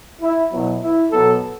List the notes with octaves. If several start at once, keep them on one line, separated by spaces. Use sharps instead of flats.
E4
B2 F#3 B3 E4
E4
B2 F#3 B3 A4